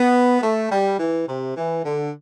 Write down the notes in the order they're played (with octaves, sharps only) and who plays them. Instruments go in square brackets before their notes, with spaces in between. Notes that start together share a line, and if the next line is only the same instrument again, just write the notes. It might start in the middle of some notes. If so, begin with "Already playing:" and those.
Already playing: [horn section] B3
A3
G3
E3
C3
E3
D3